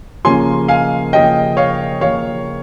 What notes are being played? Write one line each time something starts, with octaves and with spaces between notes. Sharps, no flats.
C#3 F3 A#3 C#4 G#5 C6
F5 G#5
C#3 F3 A#3 C#4 D#5 G5
C#5 F5
C#3 F3 A#3 C#4 C#5 F5